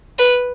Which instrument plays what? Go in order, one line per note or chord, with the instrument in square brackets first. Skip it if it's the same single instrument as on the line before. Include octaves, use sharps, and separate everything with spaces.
[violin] B4